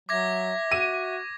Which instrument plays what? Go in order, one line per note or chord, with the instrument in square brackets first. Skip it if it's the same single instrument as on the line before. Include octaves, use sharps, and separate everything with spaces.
[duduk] F#3 [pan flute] E5 [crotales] D6 G#6 A#6
[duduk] F#4 [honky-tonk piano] D#7